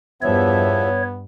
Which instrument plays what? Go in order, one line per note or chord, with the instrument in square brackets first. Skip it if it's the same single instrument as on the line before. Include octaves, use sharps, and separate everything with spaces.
[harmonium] E2 F3 E5 [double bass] G2 [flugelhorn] B3 [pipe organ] C#5